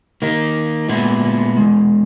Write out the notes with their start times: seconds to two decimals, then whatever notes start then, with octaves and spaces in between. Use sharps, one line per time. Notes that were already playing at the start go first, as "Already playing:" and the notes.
0.22 D#3 A#3 D#4
0.88 A#2 G#3 B3 E4
1.56 E2 C#3 G#3